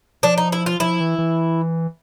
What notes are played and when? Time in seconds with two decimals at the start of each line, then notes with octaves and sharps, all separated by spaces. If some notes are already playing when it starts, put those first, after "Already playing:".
0.23 F3 D4
0.38 D#4
0.52 E4
0.66 F4
0.80 F3 E4
1.00 E3
1.18 E3